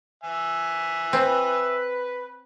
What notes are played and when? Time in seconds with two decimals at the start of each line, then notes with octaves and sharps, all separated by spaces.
0.24 E5 G#5
1.13 C4 B4